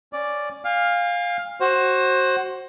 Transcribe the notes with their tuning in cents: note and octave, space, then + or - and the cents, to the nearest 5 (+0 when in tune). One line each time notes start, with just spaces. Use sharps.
C#4 +0 D5 +0
F5 +10 G#5 -45
F#4 +15 C5 +25